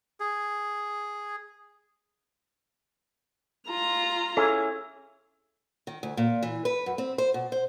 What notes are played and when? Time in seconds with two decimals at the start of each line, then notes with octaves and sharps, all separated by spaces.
0.20 G#4
3.68 F4 A#5
4.37 C#4 E4 G#4 A4
5.87 D#3
6.03 D2
6.17 A#2
6.43 E3
6.65 B4
6.86 F#2
6.98 C4
7.18 C5
7.34 B2
7.52 C5